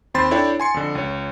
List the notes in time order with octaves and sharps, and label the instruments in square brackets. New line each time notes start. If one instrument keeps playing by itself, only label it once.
[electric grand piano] D#2 C4 C5 B5 C6 A6
D4 E4 A4 C#5 D5 G5
G#5 C6 C#7
F2 D3
C#2 C#5